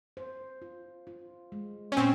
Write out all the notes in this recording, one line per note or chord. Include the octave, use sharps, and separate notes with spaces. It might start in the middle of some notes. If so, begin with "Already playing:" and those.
C5
F4
F4
G#3
C#4
A#2 C4